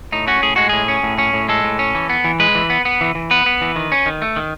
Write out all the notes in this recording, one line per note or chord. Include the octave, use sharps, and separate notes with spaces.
A2 D#4
C#4 F#4
A2 G#4
G#3 F#4
A2 G#4
C#4
A2
C#4
A2
G#3 A4
A2
C#4
E3
B3
E3
G#3 B4
E3
B3
B3
E3
E3
B3 B4
B3
E3
D#3
C#4
D#3
A3
D#3